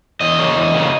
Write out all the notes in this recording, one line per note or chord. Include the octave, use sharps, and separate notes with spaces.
E2 D#5
C#3 F#3 A#3
E2
C#3 F#3 A#3